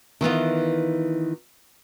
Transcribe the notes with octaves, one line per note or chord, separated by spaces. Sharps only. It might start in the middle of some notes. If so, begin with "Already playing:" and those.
D#3 E3 B3 F4